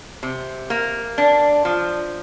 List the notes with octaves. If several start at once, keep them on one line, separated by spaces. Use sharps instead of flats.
C3
A#3
D4
F3